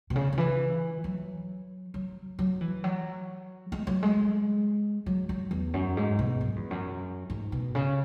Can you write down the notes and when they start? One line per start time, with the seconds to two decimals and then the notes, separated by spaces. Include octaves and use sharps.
0.10 B2
0.16 C#3
0.33 C#3
0.37 E3
1.04 F#3
1.94 F#3
2.39 F#3
2.61 E3
2.84 F#3
3.72 G#3
3.87 F#3
4.03 G#3
5.06 F#3
5.29 F#3
5.51 E2
5.74 F#2
5.97 G#2
6.19 B2
6.41 F#2
6.56 E2
6.71 F#2
7.30 G#2
7.52 B2
7.75 C#3